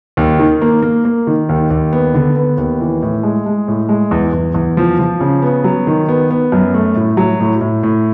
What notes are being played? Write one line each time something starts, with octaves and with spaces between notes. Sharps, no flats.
D#2
D#3
A#3
A#3
A#3
D#3
D#2
D#2
B3
D3
B3
D#2
E3
A2
G#3
G#3
A2
G#3
E2
E2
E2
F3
F3
C#3
B3
F#3
D#3
B3
B3
F#2
A3
A2
F#3
A2
A2
A2